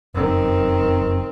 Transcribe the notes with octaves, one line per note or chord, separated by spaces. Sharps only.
F1 F#2 D#3 C4